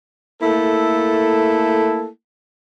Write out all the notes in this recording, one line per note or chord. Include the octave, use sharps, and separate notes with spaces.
A3 A#3 E4 A4